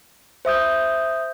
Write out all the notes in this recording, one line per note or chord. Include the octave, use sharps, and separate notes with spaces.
C5 E5 D#6 G6